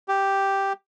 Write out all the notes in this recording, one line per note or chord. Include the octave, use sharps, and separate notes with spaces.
G4